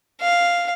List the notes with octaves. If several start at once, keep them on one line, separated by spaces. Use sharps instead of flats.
F5